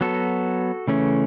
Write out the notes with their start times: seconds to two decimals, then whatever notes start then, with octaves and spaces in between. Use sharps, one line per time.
0.01 F#3 B3 F#4 A4
0.88 C#3 E3 A3 C#4